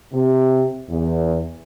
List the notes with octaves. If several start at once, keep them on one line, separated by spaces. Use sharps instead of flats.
C3
E2